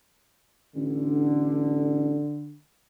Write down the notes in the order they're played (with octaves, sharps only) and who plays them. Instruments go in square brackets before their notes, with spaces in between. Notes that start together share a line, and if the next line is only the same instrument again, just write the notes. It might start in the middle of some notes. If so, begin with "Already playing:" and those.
[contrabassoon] A1 [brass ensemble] D3